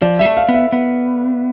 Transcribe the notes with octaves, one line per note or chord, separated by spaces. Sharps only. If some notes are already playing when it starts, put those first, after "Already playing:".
F3 D5
G3 E5
A3
F5
B3
E5
B3